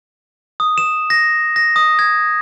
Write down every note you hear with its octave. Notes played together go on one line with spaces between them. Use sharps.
D#6
E7
A#6
A#6
D#6
G#6